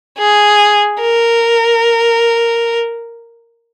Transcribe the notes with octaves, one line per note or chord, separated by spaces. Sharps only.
G#4
A#4